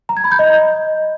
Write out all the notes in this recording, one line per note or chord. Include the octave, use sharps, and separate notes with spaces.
A#5
G#6
B5
G6
D#5